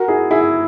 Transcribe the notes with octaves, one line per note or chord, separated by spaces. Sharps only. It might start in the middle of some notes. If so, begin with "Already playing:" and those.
Already playing: F#4 A#4
E4 G#4
E4 G#4